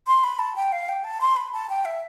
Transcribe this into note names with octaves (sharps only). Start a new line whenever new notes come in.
C6
B5
A5
G5
F5
G5
A5
C6
B5
A5
G5
E5